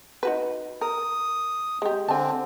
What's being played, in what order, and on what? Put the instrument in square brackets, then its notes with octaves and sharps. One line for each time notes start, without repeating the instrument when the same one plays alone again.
[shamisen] D#4 F#4 B4
[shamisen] A#4 [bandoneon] D#6
[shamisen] G#3 G4
[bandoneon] D3 C4 [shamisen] G#5 A5